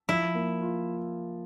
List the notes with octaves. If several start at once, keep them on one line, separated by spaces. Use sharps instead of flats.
F3 E4
A#3
F4